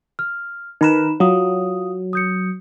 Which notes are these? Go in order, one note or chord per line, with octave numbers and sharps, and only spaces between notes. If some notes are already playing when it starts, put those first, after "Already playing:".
F6
D#3 D#4 A#4 B4 B5 E7
F#3 F4 F5 D#6
D#6 G6 C#7